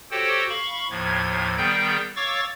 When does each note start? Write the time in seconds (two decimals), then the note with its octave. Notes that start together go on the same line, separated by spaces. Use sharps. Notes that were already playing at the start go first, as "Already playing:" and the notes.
0.11 F#4 G4 A4 C5 C#5 G5
0.49 F5 B5 C#6
0.90 D#2 A2 F3 G#6
1.57 D#3 G3 B3 G#4 G5 G6
2.16 C#5 F5 C#6 D6 E6 A6